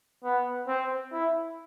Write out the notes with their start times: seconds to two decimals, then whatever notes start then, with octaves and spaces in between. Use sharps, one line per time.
0.24 B3
0.68 C4
1.12 E4